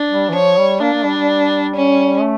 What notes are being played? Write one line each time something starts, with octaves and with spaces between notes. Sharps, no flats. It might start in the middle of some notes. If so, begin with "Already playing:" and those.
Already playing: D4
G3
E3
F3 C#5
G3
A#3 D4
A#3
G3
G3
C#4
A3